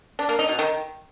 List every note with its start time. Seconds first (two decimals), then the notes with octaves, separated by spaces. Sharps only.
0.19 D4
0.29 A#3
0.39 D#4
0.49 B2
0.59 D#3